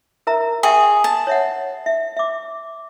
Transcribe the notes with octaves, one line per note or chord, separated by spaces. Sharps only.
A#4 E5 A#5
G#4 E5 G5 C#6
A5
C#5 E5 F#5
E5
E5 D6